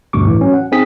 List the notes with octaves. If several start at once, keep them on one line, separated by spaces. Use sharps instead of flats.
D2 G2 B2 C#6 D6
A2 E3
F#3 C#4
F#5
C4 D#4 G#4 D#6 B6